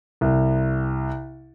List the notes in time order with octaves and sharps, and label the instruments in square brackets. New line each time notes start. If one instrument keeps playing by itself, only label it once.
[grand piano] C2